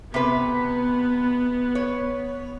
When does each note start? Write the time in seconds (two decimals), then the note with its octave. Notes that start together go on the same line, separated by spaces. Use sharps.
0.14 C3 B3 B4
1.75 C#5